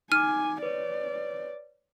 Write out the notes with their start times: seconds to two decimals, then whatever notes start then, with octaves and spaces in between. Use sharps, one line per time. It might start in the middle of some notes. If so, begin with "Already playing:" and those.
0.12 D#4 G#5 D6 F6 D#7
0.62 B4 C#5 D5